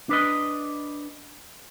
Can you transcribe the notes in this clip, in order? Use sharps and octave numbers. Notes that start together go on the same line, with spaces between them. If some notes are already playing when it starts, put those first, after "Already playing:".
D4 B4 D#5